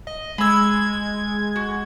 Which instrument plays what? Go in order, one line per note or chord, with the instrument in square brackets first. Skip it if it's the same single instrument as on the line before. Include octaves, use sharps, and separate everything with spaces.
[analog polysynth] D#5
[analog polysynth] G#3 G#6 [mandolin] B5 E6
[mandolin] F#4